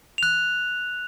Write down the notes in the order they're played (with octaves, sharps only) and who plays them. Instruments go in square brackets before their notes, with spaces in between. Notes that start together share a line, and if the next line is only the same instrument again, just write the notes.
[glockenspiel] F#6 F7